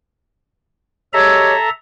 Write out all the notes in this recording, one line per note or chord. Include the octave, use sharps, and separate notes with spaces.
G#3 G4 A4 C#5 E5 A#5